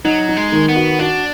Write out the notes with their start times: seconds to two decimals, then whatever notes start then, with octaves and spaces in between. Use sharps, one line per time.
0.05 F#3 D#4
0.29 D#4
0.37 G#3
0.52 D#3
0.69 B3
0.76 F#4
0.99 D4 F#4